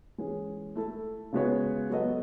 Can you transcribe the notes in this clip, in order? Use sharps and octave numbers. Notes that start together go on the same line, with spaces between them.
E3 G#3 C#4 G#4
A3 E4 A4
C#3 G#3 B3 F#4 C#5
F#3 B3 F#4 A4 D#5